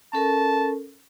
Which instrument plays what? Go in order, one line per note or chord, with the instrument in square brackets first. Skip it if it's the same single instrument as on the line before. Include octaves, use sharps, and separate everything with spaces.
[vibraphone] C#4 A4 A#4 [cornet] A5